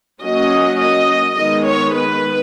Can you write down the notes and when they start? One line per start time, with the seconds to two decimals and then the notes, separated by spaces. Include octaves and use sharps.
0.22 F#3 A#3 C#4 D#5
0.80 D#5
1.37 D#3 G#3 B3 D#5
1.67 C#5
1.96 B4